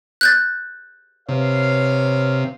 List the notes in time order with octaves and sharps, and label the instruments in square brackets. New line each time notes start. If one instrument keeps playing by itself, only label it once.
[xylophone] F#6 G6 A6
[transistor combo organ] C3 [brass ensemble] B4 C#5 F5